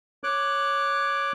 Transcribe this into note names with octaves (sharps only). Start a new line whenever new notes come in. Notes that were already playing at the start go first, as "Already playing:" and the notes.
C#5 D6 F#6